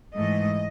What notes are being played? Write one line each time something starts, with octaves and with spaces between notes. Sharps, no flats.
G#2 E3 A3 D#5